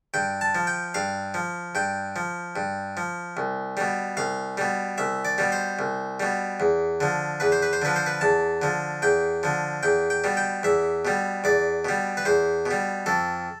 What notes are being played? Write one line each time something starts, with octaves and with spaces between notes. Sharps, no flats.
G2 G5
A5
F3
G5
G2 F5
F3
G2 G5
F3
G2
F3
C2
B2 G3
C2 F5
B2 G3
C2 E5
D5
B2 G3
C5
C2
B2 G3
E2
D3 F3
E2 B4
C5
B4
C5
D3 F3 B4
C5
B4
E2 A5
D3 F3
E2 G5
D3 F3
E2 G5
G5
B2 G3
G5
E2 E5
B2 G3
E2 D5
B2 G3
B4
E2 C5
B2
G3
F2 A4